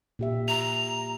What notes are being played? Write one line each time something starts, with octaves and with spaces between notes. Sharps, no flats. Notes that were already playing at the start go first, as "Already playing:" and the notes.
A#2 G4 E5
A#5 F7